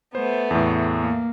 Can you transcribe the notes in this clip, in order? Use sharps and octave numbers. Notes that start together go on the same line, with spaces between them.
A3 B3 C5
E2 A2
A#3